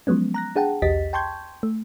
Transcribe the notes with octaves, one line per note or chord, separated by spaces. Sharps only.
F3 F#3 G#3 B3 C#4
A#5 F#6 A#6
D4 G#4 F#5 G5 A5
B1 E2 G4 D#5 A6 B6
G5 A5 C6 C#6 G6 G#6
A3